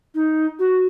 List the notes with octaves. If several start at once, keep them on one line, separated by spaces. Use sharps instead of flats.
D#4
F#4